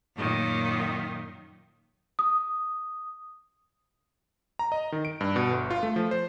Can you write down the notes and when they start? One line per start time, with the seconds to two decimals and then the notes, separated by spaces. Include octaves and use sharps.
0.15 F#2 A#2 D#3
2.19 D#6
4.59 A#5
4.72 D#5
4.92 D#3
5.05 D7
5.21 G2
5.36 B2
5.51 G1
5.70 F4
5.83 A3
5.96 F3
6.11 C5